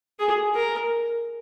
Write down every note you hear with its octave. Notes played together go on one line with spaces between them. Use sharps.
G#4
A#4